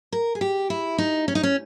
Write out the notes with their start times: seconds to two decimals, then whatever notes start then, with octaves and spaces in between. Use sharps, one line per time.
0.12 A#4
0.35 G#4
0.41 G4
0.70 E4
0.98 D#4
1.28 C#4
1.35 D#4
1.43 C#4